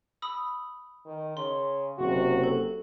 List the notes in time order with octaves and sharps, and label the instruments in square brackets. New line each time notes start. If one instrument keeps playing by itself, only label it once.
[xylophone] B5 D#6 E6
[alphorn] D#3
[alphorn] C#3 [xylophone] C6
[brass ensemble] F#1 C3 [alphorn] F#4
[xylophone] A4